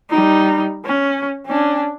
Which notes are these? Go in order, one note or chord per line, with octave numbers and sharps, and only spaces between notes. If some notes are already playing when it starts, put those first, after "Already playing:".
G3 D#4
C#4
C#4 D4